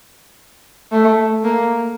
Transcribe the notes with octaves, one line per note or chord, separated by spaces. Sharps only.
A3
A#3